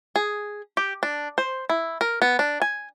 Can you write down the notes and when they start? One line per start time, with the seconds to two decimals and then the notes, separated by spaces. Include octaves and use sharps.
0.16 G#4
0.77 G4
1.03 D4
1.38 C5
1.70 E4
2.01 A#4
2.22 B3
2.39 D4
2.62 G#5